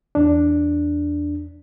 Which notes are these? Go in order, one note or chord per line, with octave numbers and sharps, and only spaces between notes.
E2 D4